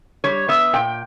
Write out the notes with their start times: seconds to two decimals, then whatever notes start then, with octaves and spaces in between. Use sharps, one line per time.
0.24 G3 C#5
0.48 B3 E5
0.73 A#2 G5